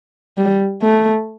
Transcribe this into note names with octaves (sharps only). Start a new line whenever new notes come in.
G3
A3